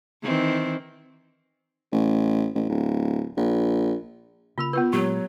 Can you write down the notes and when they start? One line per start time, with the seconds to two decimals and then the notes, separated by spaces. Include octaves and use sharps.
0.23 D#3 E3 C4
1.93 A1
2.55 A1
2.69 D1
3.37 A#1
4.58 C#3 A#3 F4 A#4 B5
4.73 B3 F4 A#4 B4
4.93 A#2 F#3 G#3 A#3 G4 C#5